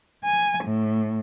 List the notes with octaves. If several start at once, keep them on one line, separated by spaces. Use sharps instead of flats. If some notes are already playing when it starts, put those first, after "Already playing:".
G#5
A2